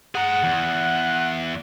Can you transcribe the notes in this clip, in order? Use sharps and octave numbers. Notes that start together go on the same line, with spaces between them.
G#4 F#5 A#5
E2